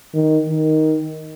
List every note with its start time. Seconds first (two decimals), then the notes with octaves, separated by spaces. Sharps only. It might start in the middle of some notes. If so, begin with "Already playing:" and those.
0.14 D#3
0.49 D#3